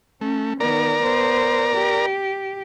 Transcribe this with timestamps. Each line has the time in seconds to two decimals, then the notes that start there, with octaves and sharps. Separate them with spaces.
0.21 A3 C#4
0.60 D#3 B3 A#4 D5 A#5
1.03 B3 C5
1.75 G4